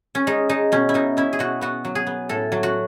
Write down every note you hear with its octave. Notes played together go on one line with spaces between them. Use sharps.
C#4
G#3 D#4
G#3 D#4
B2 C#4
E4
B2 D#4
C#4 E4
G#4
B2 F#4
B3 F#4
F#3
G#4
B3
A2 A4
F#3
F#4